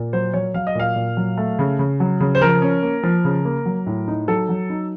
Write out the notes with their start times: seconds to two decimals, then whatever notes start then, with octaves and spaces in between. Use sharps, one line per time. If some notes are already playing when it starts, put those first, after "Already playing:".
Already playing: A#2
0.13 F#3 C5
0.34 F#3 C#5
0.54 F#3 F5
0.67 D#5
0.75 A#2 F5
0.96 A#2
1.17 F#3
1.37 A3
1.59 C#3
1.79 C#3
2.00 F#3
2.20 C#3
2.35 C5
2.41 F3 A#4
2.62 C#4
2.83 A#3
3.03 F3
3.25 C#3
3.45 A#3
3.66 F#3
3.87 A2
4.08 D#4
4.28 F#3 A4
4.49 F#3
4.70 D#4